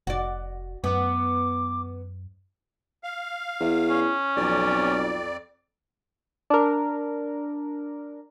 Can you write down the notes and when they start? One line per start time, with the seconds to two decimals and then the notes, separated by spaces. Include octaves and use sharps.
0.07 F1 F#4 D5
0.84 F#2 B3 D6
3.03 F5
3.60 E2
3.89 C#4
4.36 B1 F2 D5
6.50 D4 A#4